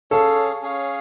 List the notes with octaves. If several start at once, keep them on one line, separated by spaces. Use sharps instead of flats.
C#4 G#4 A4 C#5 F5
C#4 G#4 C#5 F5